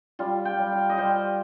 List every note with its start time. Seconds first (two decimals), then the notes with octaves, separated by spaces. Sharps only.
0.19 G3 F4
0.45 G5
0.59 G3
0.72 F5
0.89 D#5
0.98 G3 C5